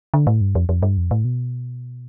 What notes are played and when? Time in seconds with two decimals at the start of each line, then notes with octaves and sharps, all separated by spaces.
0.14 D3
0.27 A2
0.41 G2
0.55 F2
0.69 F2
0.83 G2
0.97 F2
1.11 A2
1.25 B2